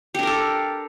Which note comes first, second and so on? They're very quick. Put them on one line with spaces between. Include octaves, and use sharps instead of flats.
G4 D4 A#4 A4